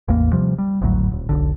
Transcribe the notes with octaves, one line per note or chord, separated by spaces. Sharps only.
A1 E2 A#3
C3 F3 G3
G3
G#1 D2 A2 F#3
D#1
E1 B1 D3